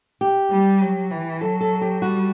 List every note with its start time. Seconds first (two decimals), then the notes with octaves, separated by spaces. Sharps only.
0.21 G4
0.51 G3
0.81 F#3
1.11 E3
1.41 F#3 A4
1.61 A4
1.81 G4
2.01 G3 F#4